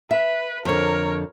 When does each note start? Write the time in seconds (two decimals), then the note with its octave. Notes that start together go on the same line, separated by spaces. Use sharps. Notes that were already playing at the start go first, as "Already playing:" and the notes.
0.11 B4 E5
0.65 F2 D3 A#4 C#5